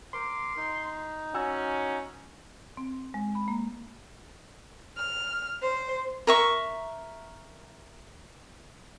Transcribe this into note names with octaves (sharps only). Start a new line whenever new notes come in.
A#4 C6 D6
D#4
C#4 F#4 G#5 E6
C4
G#3
B5
A#3
F6
C5
A#4 E5 C#6